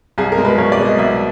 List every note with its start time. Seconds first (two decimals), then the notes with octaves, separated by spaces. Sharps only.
0.18 C2 G#4
0.32 A#4
0.38 B2 G#3
0.45 B4
0.58 C2 C#5
0.72 D5
0.78 B2 G#3
0.85 D#5
0.98 C2 E5